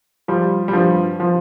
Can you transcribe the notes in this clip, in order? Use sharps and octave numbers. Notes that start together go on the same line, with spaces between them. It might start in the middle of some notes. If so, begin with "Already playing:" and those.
F3 G3
G3
G2 F3
F3